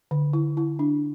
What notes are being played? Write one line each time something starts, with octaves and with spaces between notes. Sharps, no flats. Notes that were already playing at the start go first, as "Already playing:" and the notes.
D3
E4
E4
D4